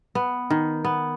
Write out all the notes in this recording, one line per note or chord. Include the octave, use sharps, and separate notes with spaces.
B3
D#3
B3